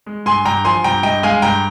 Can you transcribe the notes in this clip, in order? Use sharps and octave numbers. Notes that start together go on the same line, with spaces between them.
G#3
G2 G#5 C6
G2 G5 A#5
F3 G#5 C6
G2 G5 A#5
G2 D#5 G5
G#3 F5 G#5
G2 G5 A#5